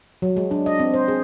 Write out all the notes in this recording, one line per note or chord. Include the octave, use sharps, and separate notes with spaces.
F#3
G#3
D4
D#5
C4
C5
G#4